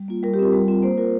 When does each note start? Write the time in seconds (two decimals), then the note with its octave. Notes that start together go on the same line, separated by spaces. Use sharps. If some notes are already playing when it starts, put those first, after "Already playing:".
Already playing: G3
0.08 A#3 F4
0.23 G3 A#4
0.34 G4
0.39 C4 F4 A#4
0.53 G3
0.68 C4 F4
0.83 A#3 C5
0.98 F4 A#4